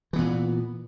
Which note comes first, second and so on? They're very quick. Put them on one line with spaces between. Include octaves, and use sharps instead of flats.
E3 B3 A#2